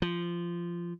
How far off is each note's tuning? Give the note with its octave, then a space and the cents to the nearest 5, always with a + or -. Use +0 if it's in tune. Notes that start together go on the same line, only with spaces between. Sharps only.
F3 -15